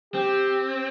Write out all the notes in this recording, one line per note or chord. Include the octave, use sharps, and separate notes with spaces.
C4 G4